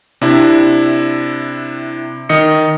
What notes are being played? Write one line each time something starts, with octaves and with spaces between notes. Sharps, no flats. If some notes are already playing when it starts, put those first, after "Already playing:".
C3 D4 E4
D#3 D#5 C#7